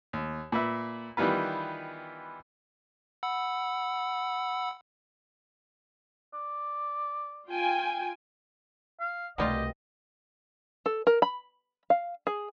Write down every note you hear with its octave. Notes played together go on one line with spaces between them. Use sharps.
D#2
A#2 B4 E5
D#3 E3 G3 B3 F4 B4
F#5 B5 E6
D5
F4 G5 G#5
F5
C2 B2 F#3 G3 A3 F4 G4 D#5
A4
A#4
B5
F5
G#4